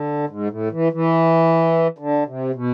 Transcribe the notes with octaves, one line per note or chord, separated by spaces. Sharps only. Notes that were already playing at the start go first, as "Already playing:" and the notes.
Already playing: D3
G#2
A2
E3
E3
D3
C3
B2